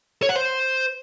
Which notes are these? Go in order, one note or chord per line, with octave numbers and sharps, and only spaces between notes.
C#5
F#5
C5